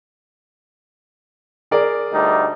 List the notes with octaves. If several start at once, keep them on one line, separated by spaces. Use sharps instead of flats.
G#4 A#4 D5
D2 G3 D#4